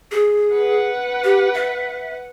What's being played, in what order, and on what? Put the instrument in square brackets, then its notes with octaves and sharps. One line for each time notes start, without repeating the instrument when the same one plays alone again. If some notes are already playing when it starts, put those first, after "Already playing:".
[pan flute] G#4
[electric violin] B4 F#5
[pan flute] G4
E5